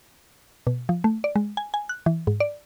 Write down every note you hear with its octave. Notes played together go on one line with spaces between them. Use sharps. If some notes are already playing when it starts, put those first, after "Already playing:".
B2
F3
A3
D5
G#3
G#5
G#5
F#6
E3
G#2
D5